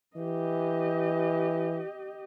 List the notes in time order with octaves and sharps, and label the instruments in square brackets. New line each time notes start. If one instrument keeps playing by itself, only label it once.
[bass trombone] E3 [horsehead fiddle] G4 D#5